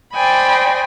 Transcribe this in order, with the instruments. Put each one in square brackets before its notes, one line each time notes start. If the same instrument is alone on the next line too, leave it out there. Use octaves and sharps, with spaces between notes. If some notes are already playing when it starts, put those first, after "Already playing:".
[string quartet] C5 D5 D#5 G5 G#5 B5